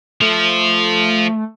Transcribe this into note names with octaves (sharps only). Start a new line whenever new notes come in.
F3 A3